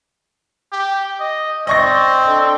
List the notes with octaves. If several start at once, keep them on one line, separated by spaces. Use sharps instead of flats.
G4
D#5
C4 D5 D#5 C#6 A#6
D4 A4